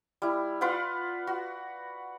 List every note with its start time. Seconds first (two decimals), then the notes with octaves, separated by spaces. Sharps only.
0.22 G3 E4
0.61 F4 B4 D5 F#5
1.27 F#4